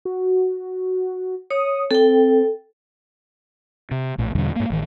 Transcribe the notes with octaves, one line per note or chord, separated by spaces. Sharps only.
F#4
C#5 D#6
C4 A4 G5
C3
A#1 A2
E2 B2 D3 G3
G#2 A#3
A1 D#3